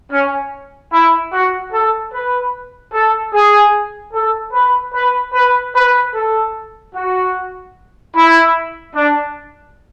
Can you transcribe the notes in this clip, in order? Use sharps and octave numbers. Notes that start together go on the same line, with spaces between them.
C#4
E4
F#4
A4
B4
A4
G#4
A4
B4
B4
B4
B4
A4
F#4
E4
D4